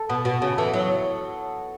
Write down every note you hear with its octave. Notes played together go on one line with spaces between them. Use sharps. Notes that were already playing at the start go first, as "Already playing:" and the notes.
Already playing: A4
B2 B3
B2 F#4
C#3 B3
E3 A4
F#3 E4
C#5